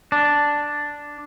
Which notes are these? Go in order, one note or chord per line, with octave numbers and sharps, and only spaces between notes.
D4